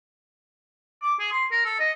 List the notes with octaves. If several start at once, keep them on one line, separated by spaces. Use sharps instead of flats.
D6
G#4
C6
A#4
A4
D#5